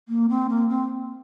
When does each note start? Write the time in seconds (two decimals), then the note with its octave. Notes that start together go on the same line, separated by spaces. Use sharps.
0.09 A#3
0.29 C4
0.49 A#3
0.69 C4